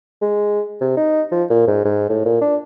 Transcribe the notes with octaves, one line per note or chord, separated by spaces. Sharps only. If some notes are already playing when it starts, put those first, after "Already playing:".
G#3
C3
D#4
F3
A#2
G#2
G#2
A2
A#2
D4